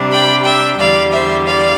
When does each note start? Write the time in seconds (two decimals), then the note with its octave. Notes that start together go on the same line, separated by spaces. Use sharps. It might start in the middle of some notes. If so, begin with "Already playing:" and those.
Already playing: C3 G3 D4
0.11 G5 B5
0.45 E5 G5
0.79 E2 D3 G3 D5 F5
1.13 C5 E5
1.47 D5 F5